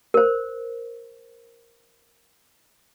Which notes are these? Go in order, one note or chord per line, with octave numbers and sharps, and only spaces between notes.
A#4 C5